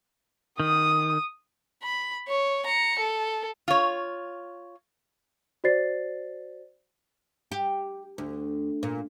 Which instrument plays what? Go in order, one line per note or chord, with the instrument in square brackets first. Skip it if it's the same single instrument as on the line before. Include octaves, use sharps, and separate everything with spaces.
[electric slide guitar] D#3 [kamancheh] D#6
[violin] B5
C#5
A#5 C#7
A4
[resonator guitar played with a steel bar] F4 C#5
[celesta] F#4 C5 D5 A6 C7
[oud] G4
D2
A#2